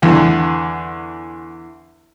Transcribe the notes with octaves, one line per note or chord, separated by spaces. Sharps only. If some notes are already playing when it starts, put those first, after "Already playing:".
E2 D3